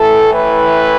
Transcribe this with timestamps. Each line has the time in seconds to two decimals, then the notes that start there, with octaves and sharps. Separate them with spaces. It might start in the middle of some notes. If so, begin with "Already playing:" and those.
Already playing: A2 E3 A4
0.34 B4